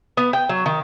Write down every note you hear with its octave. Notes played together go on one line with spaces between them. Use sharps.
B3
G5
F#3
D#3